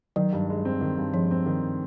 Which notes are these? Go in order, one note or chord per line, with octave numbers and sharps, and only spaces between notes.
D#3 F#3
G2
G#3
C4
D#3
G2
F3 G#3
C4
D#3